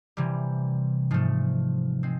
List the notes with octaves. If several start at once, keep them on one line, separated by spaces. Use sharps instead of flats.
C3 E3 G3
G#2 F3 A3
G#3 C4